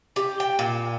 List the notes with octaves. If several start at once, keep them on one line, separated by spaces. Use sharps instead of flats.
G4
G5
A#2